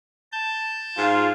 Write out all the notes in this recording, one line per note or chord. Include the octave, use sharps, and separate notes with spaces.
A5 G6
G#2 F4